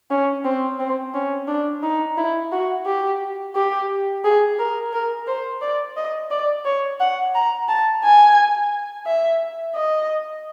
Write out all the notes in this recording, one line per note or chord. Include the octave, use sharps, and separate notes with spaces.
C#4
C4
C4
C#4
D4
D#4
E4
F#4
G4
G4
G#4
A#4
A#4
C5
D5
D#5
D5
C#5
F#5
A#5
A5
G#5
E5
D#5